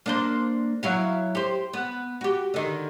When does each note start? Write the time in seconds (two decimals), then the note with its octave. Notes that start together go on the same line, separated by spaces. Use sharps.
0.06 A#3 D4 C5
0.83 F#3 E4 F5
1.35 G4 C5
1.73 B3
2.21 F#4 G4
2.54 D3 D#3